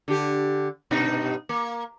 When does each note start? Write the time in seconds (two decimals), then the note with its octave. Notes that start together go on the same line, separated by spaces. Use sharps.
0.08 D3 G4
0.91 G2 B2 D#4
1.49 A#3